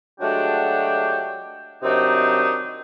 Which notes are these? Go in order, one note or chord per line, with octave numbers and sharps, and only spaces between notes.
F#3 G#3 A3 D4 F#4 G4
C3 D#3 F#3 C4 D4 D#4